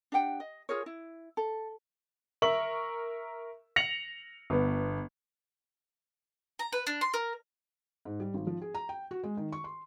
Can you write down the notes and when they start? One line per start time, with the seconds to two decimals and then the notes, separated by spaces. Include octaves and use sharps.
0.12 D4 G4 F#5 G5
0.40 D#5
0.69 F4 G#4 A#4 C#5
0.86 E4
1.37 A4
2.42 A#4 E5 C#6 F#7
3.76 A#6 C#7 F7 F#7
4.50 G1 B3
6.59 A#5
6.73 B4
6.87 D4
7.01 C6
7.14 A#4
8.05 G#2
8.20 G3
8.34 G#1
8.47 F3
8.61 G#4
8.74 A#5
8.89 G5
9.11 F#4
9.23 G#3
9.37 D#3
9.52 C#6
9.64 C6